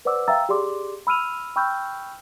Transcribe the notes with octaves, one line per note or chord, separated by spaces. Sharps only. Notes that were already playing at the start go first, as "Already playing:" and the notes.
B4 C5 D5 F#5 D6 E6
E5 F5 G5 A#5 E6 A6
G4 G#4 D5 C6 D6
B5 E6 F6 D#7 F7
G5 B5 C#6 E6 F6 G6